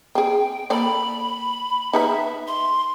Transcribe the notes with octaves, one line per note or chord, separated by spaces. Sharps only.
C4 G#4 G5
A#3 A4 D5 B5
D#4 B4 E5 B5
C6